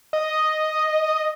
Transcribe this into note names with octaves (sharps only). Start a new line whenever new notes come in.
D#5